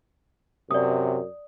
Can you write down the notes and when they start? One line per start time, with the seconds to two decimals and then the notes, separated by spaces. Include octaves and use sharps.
0.71 F#2 C3 D5 D#6